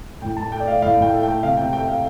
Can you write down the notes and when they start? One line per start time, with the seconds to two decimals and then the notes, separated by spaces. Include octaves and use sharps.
0.22 A2 G5
0.36 A2 A5
0.52 A3 G5
0.60 D5
0.67 A3 F5
0.82 A2 F5
0.97 A2
1.02 G5
1.12 A3
1.23 G5
1.27 A3
1.43 C3 F5
1.57 C3 G5
1.73 A3 G5
1.88 A3 F5